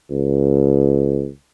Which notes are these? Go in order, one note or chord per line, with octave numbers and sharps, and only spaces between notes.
C#2